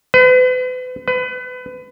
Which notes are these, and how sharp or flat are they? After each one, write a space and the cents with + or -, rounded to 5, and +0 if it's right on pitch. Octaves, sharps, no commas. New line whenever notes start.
B4 +40
B4 +30